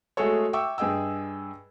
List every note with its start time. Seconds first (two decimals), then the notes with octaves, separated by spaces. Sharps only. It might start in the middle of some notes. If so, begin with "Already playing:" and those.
0.17 G#3 A3 F#4 G#4 A4 C#5
0.53 E5 G5 C#6 D6 E6
0.78 G2 G#4 D#5 G5 E6